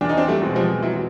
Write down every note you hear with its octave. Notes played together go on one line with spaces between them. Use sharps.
E2 D4
D#4
C4 D4
G3 A3
B2 G#3 C4
F3 G3
E2 E3 F#3